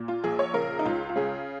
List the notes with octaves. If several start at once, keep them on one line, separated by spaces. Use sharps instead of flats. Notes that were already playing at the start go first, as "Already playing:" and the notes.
Already playing: A#2
F4
A#1 G#4
C#5
C#3 A#4
D#4
C#2 F4
F4
C#3 G#4